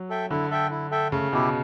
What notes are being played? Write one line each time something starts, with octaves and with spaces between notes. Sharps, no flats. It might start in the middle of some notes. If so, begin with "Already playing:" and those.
Already playing: F#3
A4 E5 G5
D3 E4
A4 E5 G5
E4
A4 E5 G5
C#3 A3
B2 E4 G4